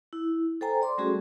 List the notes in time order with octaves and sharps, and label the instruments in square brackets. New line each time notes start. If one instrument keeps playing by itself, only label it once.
[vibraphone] E4
A4 C5 G5 G#5 A#5
D5 C6 D6
G3 A3 C#4 F#4 G#4 A4